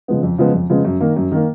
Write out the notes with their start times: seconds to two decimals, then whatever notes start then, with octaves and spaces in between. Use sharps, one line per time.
0.08 C#3 F3 G#3 B3
0.23 F2
0.38 C#3 F3 G#3 B3
0.54 F2
0.70 C#3 F3 G#3 B3
0.85 F#2
1.00 D#3 A#3
1.16 F#2
1.32 D#3 A#3